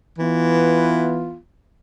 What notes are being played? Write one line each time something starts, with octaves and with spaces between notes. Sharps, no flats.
E3 B3 F4